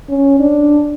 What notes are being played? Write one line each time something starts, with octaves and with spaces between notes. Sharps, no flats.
C#4
D4